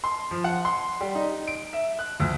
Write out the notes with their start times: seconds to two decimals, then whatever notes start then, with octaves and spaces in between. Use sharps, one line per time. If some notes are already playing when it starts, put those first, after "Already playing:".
0.04 C6
0.31 F3
0.44 F#5
0.65 C6
1.01 G3
1.15 D#4
1.47 D7
1.73 E5
1.99 F#6
2.20 D2